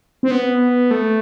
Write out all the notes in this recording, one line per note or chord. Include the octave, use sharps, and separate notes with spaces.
C4
B3
A3